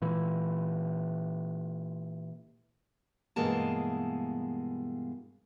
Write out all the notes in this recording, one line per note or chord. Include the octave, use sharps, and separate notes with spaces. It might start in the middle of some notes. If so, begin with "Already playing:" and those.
A#2 E3
G2 B2 E3 G#3 A#3 A5